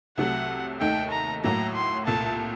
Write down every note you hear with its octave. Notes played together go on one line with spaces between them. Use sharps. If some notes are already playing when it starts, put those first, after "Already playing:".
C2 C3 F#3 A3 F#5
D#2 D#3 A3 D#4 G5
A#5
A2 F#3 A#3 A#5
C6
C2 A#2 A3 A5